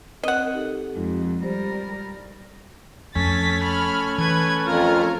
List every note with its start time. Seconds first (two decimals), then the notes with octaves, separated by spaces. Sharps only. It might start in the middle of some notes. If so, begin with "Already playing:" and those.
0.23 C4 A#4 D#5 F#5 D#6
0.54 D#4 G4 A4
0.96 F2 G#3 D#4 F4
1.44 G3 G4 A#4 C5
3.15 F2 A3 C#4 G#5 A6 B6
3.63 B5 F6
4.18 E3 B4 G#6
4.67 F2 F4 A#4 F6